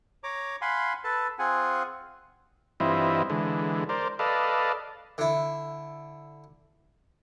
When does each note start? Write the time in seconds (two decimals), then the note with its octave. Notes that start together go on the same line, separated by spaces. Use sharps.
0.24 C#5 A#5 D6
0.61 F5 F#5 G#5 B5 C6
1.04 A4 B4 A5
1.39 C4 F4 G#4 F#5 G#5
2.80 G2 E3 C4 E4 F4 D#5
3.30 D3 E3 G#3
3.89 A#4 C5 D5
4.19 A4 B4 D5 D#5 F5
5.18 D3 E4